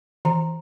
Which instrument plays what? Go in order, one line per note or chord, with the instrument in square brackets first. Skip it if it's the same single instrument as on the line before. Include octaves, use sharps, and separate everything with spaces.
[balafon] E3 A#5